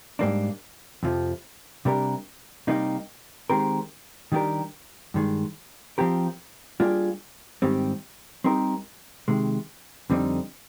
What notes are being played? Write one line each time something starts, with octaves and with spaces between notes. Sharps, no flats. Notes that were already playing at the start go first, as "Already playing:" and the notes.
G#2 G3 A#3 D4
F2 C3 F3
C3 G3 D4 G4 A#4
C3 G3 A#3 D#4 G4
D#3 G#3 C4 G4 A#4
D#3 G3 D4 G4 A#4
G2 D#3 G#3
F3 C4 G4 A#4
G3 A#3 D4 F4 G#4
G#2 D#3 G3 C4 G4
G3 C4 D#4 G4 A#4
C3 D#3 G#3
F2 D3 G3 C4 D#4